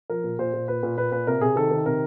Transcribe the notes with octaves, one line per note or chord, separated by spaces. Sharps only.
F3 A#4
A#2
A#2 C5
A#2
A#2 B4
A#2
A#2 B4
A#2 B4
C3 A#4
C3 G#4
D#3 A4
D#3
C3 A#4